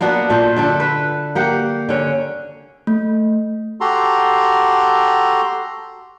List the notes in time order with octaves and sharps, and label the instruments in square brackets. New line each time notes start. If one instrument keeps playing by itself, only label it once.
[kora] A#3 B3 D4 F#4
A#2 A3 A4 C5
D3 D4 A4
B4
A#3 G4 F#5
D3 C#4
[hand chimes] A3
[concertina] F#4 G4 A4 A#5 C6